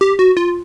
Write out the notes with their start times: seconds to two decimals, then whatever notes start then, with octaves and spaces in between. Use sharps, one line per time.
0.01 G4
0.19 F#4
0.37 F4